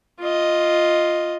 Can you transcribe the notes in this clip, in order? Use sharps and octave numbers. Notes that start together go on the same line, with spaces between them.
F4 D#5